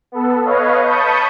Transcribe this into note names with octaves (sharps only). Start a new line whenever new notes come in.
B3 A4
B4 C#5 D#5 F5
A5 B5 C#6 D#6 G6